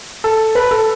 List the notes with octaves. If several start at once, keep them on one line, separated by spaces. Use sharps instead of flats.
A4
B4
A4